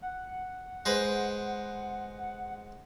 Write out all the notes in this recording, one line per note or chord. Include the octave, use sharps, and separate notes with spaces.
F#5
G#3 B4 C5